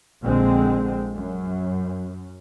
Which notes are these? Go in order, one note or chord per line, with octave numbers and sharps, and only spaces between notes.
A#1 D3 G#3 C4
F#2